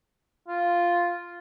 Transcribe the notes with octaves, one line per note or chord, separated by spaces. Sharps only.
F4